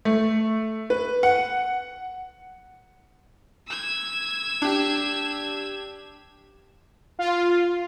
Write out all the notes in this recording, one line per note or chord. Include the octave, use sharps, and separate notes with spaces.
A3
B4
F#5
E6 G#6
D4 G4
F4